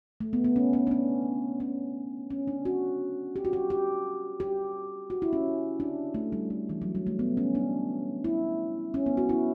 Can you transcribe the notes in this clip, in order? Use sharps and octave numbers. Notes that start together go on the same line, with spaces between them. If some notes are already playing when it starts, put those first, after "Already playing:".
A3
B3
B3
C#4
C#4
D4
C#4
C#4
C#4
D4
F#4
G4
F#4
G4
G4
G4
F#4
E4
C#4
D4
A3
G3
A3
E3
F#3
G3
A3
B3
C#4
D4
E4
C#4
B3
F#4
E4